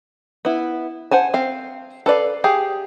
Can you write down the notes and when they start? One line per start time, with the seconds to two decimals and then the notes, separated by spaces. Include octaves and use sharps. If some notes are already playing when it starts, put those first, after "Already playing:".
0.45 B3 E4
1.11 C5 F#5 G#5 A5
1.34 C4 F5
2.06 A4 B4 D5 F5
2.44 G4 G#4 F5